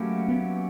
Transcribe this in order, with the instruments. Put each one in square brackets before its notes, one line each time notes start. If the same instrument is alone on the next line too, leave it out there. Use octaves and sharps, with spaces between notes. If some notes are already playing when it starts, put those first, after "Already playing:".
Already playing: [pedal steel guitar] F#3 A#3 C#4 E4 G4 [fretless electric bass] A3
[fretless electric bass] B3